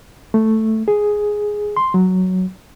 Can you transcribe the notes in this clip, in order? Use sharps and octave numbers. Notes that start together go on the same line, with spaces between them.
A3
G#4
C6
F#3